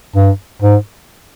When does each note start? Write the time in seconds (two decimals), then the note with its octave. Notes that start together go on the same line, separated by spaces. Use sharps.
0.16 G2
0.62 G#2